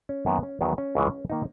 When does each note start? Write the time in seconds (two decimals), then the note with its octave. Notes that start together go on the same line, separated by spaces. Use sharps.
0.09 C#4
0.26 F#2 D#3 A#3 B3
0.43 C#4
0.61 E2 D#3 F#3 B3
0.78 C#4
0.95 C#2 C#3 E3 G#3
1.30 D#3 A#3 D#4